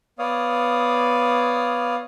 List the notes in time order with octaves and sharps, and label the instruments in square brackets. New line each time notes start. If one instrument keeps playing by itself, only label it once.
[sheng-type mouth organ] B3 C#5 D5 F5 D#6